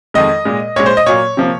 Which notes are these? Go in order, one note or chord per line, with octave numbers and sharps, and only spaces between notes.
F2 D#3 G#3 D#5
A#2 G#3
A#2 G#3 C#5
C5
D#5
A#2 F#3 A#3 C#5
C3 F3 A#3